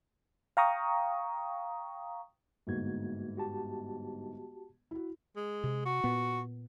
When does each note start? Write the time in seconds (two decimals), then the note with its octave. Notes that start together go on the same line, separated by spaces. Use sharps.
0.57 F5 G5 A#5 C#6 D#6
2.67 G1 G#2 A#3 F#4 G#6
3.37 F#4 G4 A5
4.91 E4 F#4
5.36 G#3
5.64 C3
5.85 F#4
6.04 A#2 B3